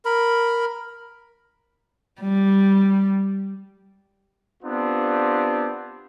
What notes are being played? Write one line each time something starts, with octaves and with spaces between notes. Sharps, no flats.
A#4 B5
G3
B3 C4 D4 F4 G4